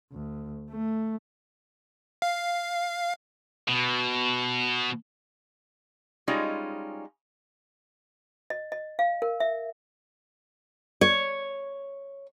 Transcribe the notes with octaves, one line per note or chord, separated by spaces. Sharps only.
D2
A3
F5
B2
G3 G#3 C#4 D#4 F4
D#5
D#5
F5
A#4
E5
C#5